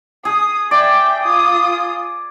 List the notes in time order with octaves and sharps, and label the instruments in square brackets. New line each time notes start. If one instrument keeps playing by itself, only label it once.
[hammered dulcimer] G#4 [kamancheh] D#6
[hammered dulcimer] D5 [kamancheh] E5 G5
[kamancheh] F4 D#6